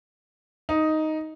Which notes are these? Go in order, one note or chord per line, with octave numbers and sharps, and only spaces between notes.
D#4